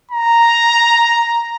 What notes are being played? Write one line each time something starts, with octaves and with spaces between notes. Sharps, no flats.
A#5